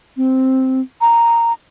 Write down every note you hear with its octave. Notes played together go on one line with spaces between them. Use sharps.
C4
A#5